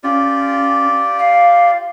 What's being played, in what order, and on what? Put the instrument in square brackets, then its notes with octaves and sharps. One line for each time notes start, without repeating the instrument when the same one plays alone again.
[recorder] C#4 [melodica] F4 G4 D5
[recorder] F5